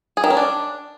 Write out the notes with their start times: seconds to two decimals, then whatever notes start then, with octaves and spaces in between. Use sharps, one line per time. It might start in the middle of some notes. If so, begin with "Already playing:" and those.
0.17 G#4
0.24 D#3
0.30 C#4
0.37 D4